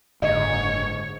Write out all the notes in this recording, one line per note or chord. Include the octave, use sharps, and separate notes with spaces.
F#1 G#2 D3 C#5 D#5